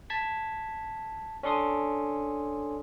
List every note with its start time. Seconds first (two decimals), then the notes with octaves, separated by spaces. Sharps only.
0.10 A5 G#6 B6
1.43 C#4 D4 A4 C6 D#6